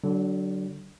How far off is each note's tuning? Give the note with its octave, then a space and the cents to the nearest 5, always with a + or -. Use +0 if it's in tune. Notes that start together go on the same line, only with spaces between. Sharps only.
D3 +0 F#3 +35